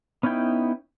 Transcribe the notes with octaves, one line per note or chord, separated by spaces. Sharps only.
B3 C#4 D#4 E4 G5